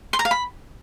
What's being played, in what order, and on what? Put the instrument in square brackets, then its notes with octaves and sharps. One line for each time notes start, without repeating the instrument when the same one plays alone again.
[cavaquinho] C6
A#5
F5
B5